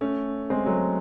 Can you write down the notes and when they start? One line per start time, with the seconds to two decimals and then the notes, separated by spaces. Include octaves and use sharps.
0.01 A3 C#4
0.50 G#3 C4
0.66 F#3 A3